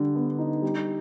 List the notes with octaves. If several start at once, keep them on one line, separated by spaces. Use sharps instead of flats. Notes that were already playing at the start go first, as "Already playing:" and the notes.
Already playing: D3 G3
B3
D#4
G3